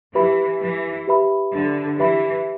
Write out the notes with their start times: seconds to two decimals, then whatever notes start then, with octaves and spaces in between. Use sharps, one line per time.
0.15 E3 G4 B4 E5 B5
0.61 E3
1.07 G4 B4 E5 B5
1.53 D3
1.99 E3 G4 B4 E5 B5